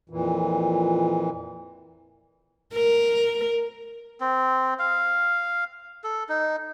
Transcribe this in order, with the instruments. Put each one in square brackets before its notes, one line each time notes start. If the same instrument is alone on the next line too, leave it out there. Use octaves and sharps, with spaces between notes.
[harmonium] F2 A#2 E3
[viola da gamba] A#4
[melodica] C4
F5
A4
D#4